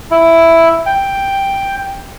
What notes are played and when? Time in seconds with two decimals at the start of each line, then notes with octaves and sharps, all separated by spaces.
0.11 E4
0.86 G5